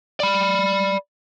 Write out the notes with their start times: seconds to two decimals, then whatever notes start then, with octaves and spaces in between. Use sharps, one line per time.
0.20 D5 B5